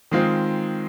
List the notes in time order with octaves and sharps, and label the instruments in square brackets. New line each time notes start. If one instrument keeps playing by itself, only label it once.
[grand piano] D#3 G#3 C4 F4